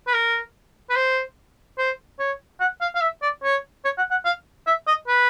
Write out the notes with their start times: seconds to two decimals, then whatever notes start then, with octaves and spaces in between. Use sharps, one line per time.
0.07 B4
0.14 A#4
0.90 B4
0.96 C5
1.78 C5
2.19 C#5
2.60 F#5
2.81 F5
2.95 F5
3.01 E5
3.22 D5
3.44 C#5
3.85 C#5
3.98 F#5
4.11 F#5
4.25 F5
4.67 E5
4.88 D#5
5.08 B4